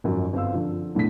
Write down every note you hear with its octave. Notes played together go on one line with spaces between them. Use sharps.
G#1 F#2 F3 F#3
G1 C4 F5 E6
D3 F3
E2 A2 D3 B6